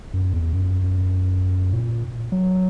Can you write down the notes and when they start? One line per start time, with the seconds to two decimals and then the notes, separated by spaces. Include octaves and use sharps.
0.14 F#2
0.33 E2
0.53 F#2
1.72 A#2
2.32 F#3